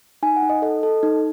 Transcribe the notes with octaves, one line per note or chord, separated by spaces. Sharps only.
D#4 G#5
F#5
D#4
D#5
A4 D#5
A4
D#4